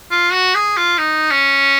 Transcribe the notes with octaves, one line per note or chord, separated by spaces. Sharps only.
F4
F#4
G#4
F4
D#4
C#4